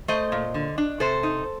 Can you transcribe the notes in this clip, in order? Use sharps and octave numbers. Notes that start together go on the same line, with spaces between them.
A3 C5 D#5
A#2
D3
D4
C3 A4 C5
D#4